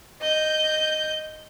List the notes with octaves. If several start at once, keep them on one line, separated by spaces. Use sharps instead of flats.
D#5 G6